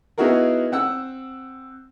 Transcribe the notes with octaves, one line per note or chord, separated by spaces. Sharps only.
B3 D#4 E4 F#4 G#4 A#4
C4 F#5 E6